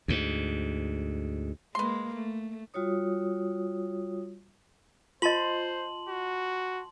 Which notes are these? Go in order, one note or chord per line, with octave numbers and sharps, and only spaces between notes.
D2 G#2
G#3 A#3 B4 C6
A3
G3 F4 F#4 C#5 D#6
F4 C5 D#5 A5 C6 F#7
F#4